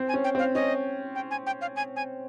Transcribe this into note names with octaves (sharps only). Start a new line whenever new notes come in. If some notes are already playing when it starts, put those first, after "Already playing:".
Already playing: C4
G#5
C#4
G5
C4 F5
C#4 D#5
G5
G#5
G5
F5
G#5
G#5